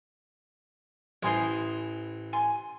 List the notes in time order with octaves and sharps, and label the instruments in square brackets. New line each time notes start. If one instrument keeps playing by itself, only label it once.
[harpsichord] A1 E3 C5 [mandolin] G#5 C6 D#6
[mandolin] G#5 C6